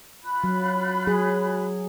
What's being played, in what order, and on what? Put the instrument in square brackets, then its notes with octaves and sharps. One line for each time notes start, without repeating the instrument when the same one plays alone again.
[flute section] F4 B5 F#6
[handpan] F#3
F#3 G#4